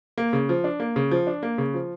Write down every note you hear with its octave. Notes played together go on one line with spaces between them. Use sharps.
A#3
C#3
F3
D4
A#3
C#3
F3
D4
A#3
C#3
F3